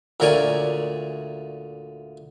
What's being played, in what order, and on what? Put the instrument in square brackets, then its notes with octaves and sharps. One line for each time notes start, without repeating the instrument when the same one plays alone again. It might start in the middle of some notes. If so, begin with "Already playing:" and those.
[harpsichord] D2 A#2 A#4 C#5 D5 G#5